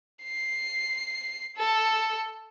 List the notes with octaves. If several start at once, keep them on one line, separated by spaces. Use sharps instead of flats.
C7
A4